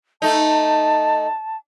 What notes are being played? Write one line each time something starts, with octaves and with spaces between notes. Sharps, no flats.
A3 D#4 A5